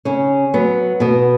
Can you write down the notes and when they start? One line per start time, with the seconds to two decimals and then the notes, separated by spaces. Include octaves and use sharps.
0.05 C#3 C#4
0.54 F#3 B3
1.00 B2 B3